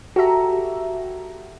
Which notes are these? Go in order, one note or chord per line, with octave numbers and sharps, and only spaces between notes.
F#4 G4 A4 E5 A#5